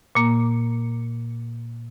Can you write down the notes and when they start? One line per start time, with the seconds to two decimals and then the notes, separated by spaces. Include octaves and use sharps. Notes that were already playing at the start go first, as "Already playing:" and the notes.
0.15 A#2 A#3